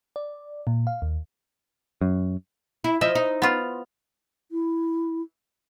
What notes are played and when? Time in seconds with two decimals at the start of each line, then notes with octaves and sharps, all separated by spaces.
0.16 D5
0.67 A#2
0.87 F5
1.02 D#2
2.01 F#2
2.84 E4
3.01 F3 D#5 E5
3.15 D#4
3.42 B3 F4
4.51 E4